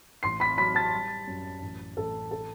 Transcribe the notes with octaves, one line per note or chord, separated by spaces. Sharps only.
A1 C6 C7
B5 B6
F#3 B5 B6
A5 A6
G3
F#2
A1
A1 A4 A5
A4 A5